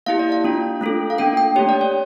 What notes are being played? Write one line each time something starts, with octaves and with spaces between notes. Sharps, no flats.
A#3 E4 G4 F5
D5
F5
A#3 D4 F4
A3 D4 F4 A4
F5
A#3 D4 A4 G5
G5
A3 D4 G4 C#5
D5
C#5